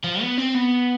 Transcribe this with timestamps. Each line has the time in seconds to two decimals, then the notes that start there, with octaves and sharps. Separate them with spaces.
0.04 F3
0.21 B3
0.38 C4
0.55 B3